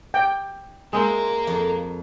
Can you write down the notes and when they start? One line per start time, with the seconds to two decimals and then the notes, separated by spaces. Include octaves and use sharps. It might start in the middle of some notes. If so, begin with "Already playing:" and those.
0.14 G5
0.93 G#3 A#3 C5 E5
1.47 F2